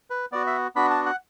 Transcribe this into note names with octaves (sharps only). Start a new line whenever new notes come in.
B4
B3 F#4 D5
E5
B3 D4 F#4 B5
A5
F#5